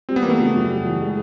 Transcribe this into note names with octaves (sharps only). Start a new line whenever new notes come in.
G3 C4
B3
E3 A#3
A3 B3
C#3
F#2
G3
E3
G#3